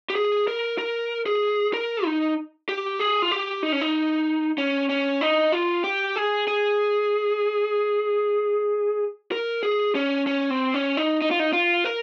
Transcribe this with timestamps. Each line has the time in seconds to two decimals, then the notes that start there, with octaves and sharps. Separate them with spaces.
0.10 G4
0.15 G#4
0.47 A#4
0.78 A#4
1.26 G#4
1.74 A#4
2.05 D#4
2.69 G4
2.99 G#4
3.22 F4
3.31 G4
3.63 D#4
3.72 C#4
3.81 D#4
4.58 C#4
4.89 C#4
5.21 D#4
5.52 F4
5.84 G4
6.16 G#4
6.47 G#4
9.32 A#4
9.63 G#4
9.95 C#4
10.27 C#4
10.50 C4
10.74 C#4
10.97 D#4
11.22 D#4
11.31 F4
11.40 D#4
11.53 F4
11.84 A#4